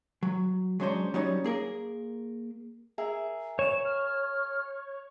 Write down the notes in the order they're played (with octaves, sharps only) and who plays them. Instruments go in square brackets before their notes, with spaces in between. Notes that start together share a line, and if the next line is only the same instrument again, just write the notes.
[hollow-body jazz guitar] F#3
F#3 G#3 C#4 D4 C5 C#5
F#3 G3 C#4 D#4 C#5
A#3 G#4 A#4
[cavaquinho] G#4 A#4 E5
[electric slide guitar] C#5 [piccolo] E7
[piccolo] F6